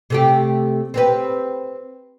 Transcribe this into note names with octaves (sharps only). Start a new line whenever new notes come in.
C3 A3 G4
C4 G4 B4